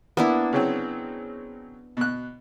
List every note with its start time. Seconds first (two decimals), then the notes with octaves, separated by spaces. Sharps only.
0.17 A#3 B3 D4 E4
0.53 C#3 F#3 C4
1.97 B2 F#6